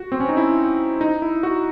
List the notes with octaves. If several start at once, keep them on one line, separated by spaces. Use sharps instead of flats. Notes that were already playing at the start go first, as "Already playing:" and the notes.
Already playing: F#4
C4
C#4
D#4
E4
D#4
E4
F#4